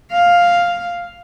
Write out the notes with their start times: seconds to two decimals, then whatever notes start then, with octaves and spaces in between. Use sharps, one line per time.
0.12 F5